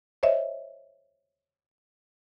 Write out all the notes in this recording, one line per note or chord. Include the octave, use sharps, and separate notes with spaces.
C5 C#5 D#5 E5